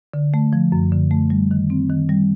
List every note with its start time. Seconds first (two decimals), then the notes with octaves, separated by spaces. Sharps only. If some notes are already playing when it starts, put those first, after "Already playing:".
0.14 D3
0.34 A3
0.53 F3
0.72 F#2
0.92 D3
1.11 A3
1.30 G3
1.51 D#3
1.70 C4
1.89 D#3
2.09 G3